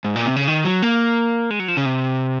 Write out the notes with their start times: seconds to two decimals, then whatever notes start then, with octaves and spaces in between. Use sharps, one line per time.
0.05 G#2
0.16 A#2
0.26 C3
0.36 C#3
0.48 D#3
0.65 F#3
0.82 A#3
1.50 G#3
1.60 F#3
1.68 F3
1.77 C#3
1.85 C3